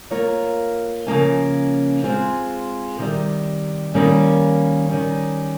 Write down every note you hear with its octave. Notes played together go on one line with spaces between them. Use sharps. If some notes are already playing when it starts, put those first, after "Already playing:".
A#3 F4 A#4 C#5
C#3 F3 A#3 C#4
G#3 C4 F4 G#4 C5
C3 D#3 G3
D#3 G3 A#3 C#4
D#3 G3 C#4